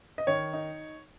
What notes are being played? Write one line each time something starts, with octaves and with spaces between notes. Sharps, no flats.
D#5
D#3 C#5
D#4